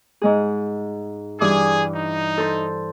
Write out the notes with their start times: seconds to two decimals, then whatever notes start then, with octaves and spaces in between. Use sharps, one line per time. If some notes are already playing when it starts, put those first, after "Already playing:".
0.22 G#2 G#3 G#4
1.40 G2 E3 G#4 D6
1.95 D#4
2.38 A4 C5